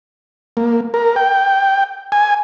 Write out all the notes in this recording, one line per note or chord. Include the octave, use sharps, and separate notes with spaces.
A#3
A#4
G5
G#5